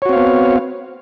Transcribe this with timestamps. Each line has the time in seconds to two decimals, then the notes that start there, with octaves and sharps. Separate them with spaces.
0.02 C#5
0.06 F#4
0.09 C4
0.13 F5
0.16 B3